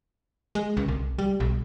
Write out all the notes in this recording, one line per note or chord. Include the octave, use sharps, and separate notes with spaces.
G#3
C#2
C2
G3
B1